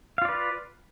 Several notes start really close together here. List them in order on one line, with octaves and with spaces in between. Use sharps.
F5 F4 D5 B4